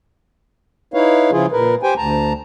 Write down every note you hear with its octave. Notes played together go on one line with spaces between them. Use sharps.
D#4 E4 B4 C#5 F5
C#3 F3 E4 F4 G#4
A#2 A#4 B4
G4 C5 G5 G#5
D2 A5 A#5